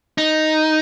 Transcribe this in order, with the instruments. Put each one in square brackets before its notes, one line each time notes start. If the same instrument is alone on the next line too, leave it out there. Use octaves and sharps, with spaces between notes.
[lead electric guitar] D#4